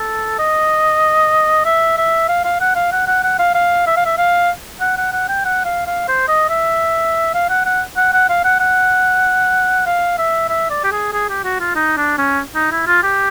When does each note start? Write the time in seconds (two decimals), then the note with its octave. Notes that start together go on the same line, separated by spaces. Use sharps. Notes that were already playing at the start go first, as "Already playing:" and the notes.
Already playing: A4
0.39 D#5
1.65 E5
1.97 E5
2.29 F5
2.44 F5
2.61 F#5
2.76 F5
2.92 F#5
3.07 F#5
3.24 F#5
3.39 F5
3.55 F5
3.87 E5
3.96 F5
4.06 E5
4.18 F5
4.81 F#5
4.97 F#5
5.12 F#5
5.28 G5
5.45 F#5
5.65 F5
5.87 F5
6.08 C5
6.28 D#5
6.49 E5
7.34 F5
7.50 F#5
7.65 F#5
7.96 F#5
8.13 F#5
8.29 F5
8.44 F#5
8.60 F#5
9.86 F5
10.18 E5
10.49 E5
10.70 D5
10.84 G4
10.92 G#4
11.13 G#4
11.29 G4
11.44 F#4
11.60 F4
11.75 D#4
11.97 D4
12.18 C#4
12.55 D#4
12.71 E4
12.87 F4
13.03 G4